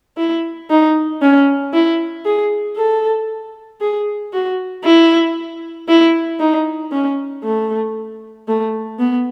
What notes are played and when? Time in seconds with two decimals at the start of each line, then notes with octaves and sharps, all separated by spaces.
0.17 E4
0.70 D#4
1.22 C#4
1.73 E4
2.25 G#4
2.77 A4
3.81 G#4
4.33 F#4
4.84 E4
5.88 E4
6.40 D#4
6.92 C#4
7.44 A3
8.48 A3
8.99 B3